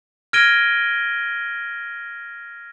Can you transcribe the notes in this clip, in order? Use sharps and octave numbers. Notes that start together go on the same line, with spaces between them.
F6 G#6 A#6 D7 D#7 G7